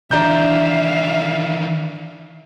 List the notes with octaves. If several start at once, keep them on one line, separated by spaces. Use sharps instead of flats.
D#3 E3 D4 E5 F5 A#5 G6